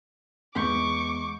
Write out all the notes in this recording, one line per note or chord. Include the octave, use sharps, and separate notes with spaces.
E2 G#2 C#6 D6 G6